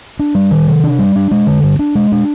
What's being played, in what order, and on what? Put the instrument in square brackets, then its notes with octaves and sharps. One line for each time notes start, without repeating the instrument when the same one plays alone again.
[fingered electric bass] D4
G3
D#3
C3
D4
G3
D4
G#3
D3
G2
D4
G#3
D4